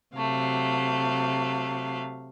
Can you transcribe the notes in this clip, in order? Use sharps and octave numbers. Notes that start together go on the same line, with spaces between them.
C3 F#3 A3 F5